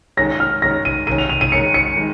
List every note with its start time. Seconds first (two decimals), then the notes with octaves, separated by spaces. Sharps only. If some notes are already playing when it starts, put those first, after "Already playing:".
0.17 D#3 G#3 C#4 A#6
0.40 F6
0.62 D#3 G#3 C#4 A#6
0.85 D#7
1.07 D#3 G#3 C#4 D#7
1.18 F7
1.29 F7
1.41 D#7
1.52 D#3 G#3 C#4 C#7
1.74 C#7
1.96 D#3 G#3